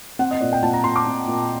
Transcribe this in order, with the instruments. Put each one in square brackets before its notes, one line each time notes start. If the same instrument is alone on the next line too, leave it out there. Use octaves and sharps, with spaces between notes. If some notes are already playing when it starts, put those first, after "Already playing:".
[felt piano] C4 F#5
D#5
A#2 D5
G5
A#2 A5
A#5
A#2 C6
D6
C4
A#2